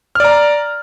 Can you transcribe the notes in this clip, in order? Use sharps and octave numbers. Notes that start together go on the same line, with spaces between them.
D5 A#5 F6